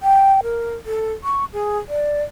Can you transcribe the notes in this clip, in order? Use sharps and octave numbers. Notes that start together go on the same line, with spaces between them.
G5
A#4
A4
C#6
G#4
D5